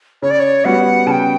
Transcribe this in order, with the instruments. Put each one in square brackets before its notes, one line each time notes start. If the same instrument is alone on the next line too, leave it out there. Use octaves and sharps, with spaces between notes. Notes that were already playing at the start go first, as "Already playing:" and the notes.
[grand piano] C#3 [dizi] C#5
[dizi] D5
C#5
[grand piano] G3 B3 F#4 [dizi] F#5
[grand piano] C#3 [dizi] A5
[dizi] G5